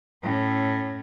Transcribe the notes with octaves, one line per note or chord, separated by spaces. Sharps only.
A2 C#4